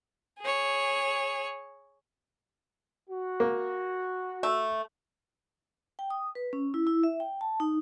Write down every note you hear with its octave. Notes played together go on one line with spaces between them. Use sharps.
G#4 C#5
F#4
A#3
A3
G5
D#6
B4
C#4
E4
E4
E5
G5
A5
D#4